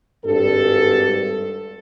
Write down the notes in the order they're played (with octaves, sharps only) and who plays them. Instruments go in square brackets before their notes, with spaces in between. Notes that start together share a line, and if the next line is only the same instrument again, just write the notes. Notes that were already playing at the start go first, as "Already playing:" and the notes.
[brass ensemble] G#1 G2 A4